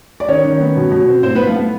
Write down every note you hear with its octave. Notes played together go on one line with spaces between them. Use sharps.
D5
D#3 C#4 C#5
D#3
B3
B2
B2
C4
A2 C4 C5
B3 B4
A2
F3 F4
B3